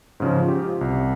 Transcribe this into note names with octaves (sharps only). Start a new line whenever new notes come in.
G#2 C#3 F3
F4 G4
C2